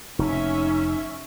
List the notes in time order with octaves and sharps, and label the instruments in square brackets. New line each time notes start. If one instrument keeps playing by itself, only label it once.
[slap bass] F1 [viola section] C#4 E5 [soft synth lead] D#4